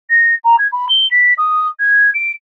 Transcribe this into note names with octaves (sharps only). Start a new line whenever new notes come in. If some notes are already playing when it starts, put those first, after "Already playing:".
A#6
A#5
G#6
B5
G7
B6
D#6
G#6
D7